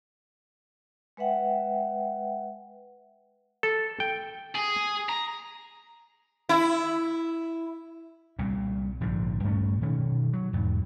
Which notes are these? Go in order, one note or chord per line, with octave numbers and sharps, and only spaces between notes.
G#3 B4 E5 F#5 G5
A4
G5
G#4
A#5
E4
C2 A#2
A#1 G#2 D3 F3
G2 A3 C4 C#4
B2 D#3 C#4
F#3
E2 G#2 B2 F#3